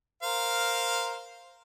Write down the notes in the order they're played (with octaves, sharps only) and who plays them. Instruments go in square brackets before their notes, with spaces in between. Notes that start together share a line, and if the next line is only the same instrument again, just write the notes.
[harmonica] A#4 C5 F5